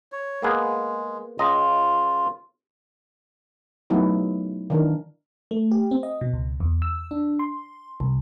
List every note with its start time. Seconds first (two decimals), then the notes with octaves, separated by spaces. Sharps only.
0.12 C#5
0.42 G#3 A#3 B3 G#4
1.39 C#2 F4 D#5 A#5
3.90 F#3 A3 B3 D#4 E4
4.70 D#3 E3 D4 A#4
5.51 A3
5.71 G4
5.91 C4
6.03 D#5
6.21 B2
6.33 C#2
6.60 E2
6.82 E6
7.11 D4
7.39 C6
8.00 C2